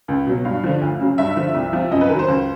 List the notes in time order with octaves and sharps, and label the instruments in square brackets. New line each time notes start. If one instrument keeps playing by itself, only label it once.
[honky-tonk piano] C#2
B2 F#3
G2 F5
D3 F3
D2
C#3 F#3
G2 E5
D3 F3
C2
C3 F3
F#2 D#5
B4
D#3 A#4
F#3
C5
C#2